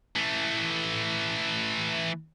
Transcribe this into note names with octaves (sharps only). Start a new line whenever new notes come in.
E3 A3